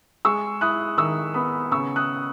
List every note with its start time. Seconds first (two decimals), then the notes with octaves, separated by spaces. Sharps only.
0.25 G#3 C#6 E6
0.61 E4 D#6 F#6
0.98 D#3 C#6 E6
1.34 B3 B5 D#6
1.72 C#3 C#6 E6
1.96 D#6 F#6